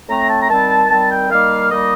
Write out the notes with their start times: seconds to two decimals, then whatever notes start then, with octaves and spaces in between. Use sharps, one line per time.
0.09 A2 A3 C4 A#5
0.29 A5
0.41 A#5
0.49 D#3 G3 C4 A5
0.90 D#3 G3 C4 A5
1.11 G5
1.30 D#3 G3 A#3 D#4 F5
1.71 D#3 G3 A#3 D#4 D#5